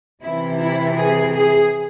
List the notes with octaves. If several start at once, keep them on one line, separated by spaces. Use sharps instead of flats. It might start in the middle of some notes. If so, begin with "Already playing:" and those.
C3 E3 E4
E4
G#4
G#4